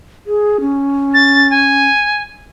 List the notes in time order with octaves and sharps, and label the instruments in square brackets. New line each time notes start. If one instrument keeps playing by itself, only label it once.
[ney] G#4
C#4
[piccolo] A6
G#5